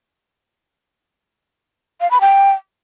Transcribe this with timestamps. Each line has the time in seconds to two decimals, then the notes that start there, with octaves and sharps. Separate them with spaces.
2.01 F5
2.11 B5
2.21 G5